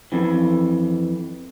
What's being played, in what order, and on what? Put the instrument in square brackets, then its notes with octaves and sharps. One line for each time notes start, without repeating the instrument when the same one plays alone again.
[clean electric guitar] F2 E3